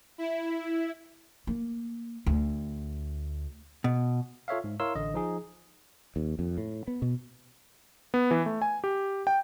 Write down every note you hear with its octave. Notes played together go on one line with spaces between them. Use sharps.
E4
A#3
D2
B2
F4 A4 C#5 E5 F5
G#2
E4 A#4 C#5 F5 C6 E6
A1 D3 D#5
F3 D#4 G#4
D#2
F2
A2
B3
B2
B3
E3
A3
G#5
G4
G5